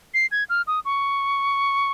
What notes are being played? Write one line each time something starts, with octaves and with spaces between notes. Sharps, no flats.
C7
G#6
F6
D#6
C#6